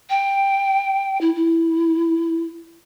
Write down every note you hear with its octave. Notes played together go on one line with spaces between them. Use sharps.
G5
E4
E4